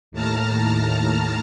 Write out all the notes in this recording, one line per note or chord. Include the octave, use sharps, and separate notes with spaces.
D#2 A2 A5 A#5 F6